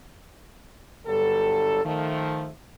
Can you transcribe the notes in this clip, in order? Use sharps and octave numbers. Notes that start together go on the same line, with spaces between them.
G1 G2 F#3 G3 A4
D#3 F3 A3